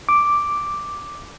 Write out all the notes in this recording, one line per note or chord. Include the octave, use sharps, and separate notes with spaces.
D6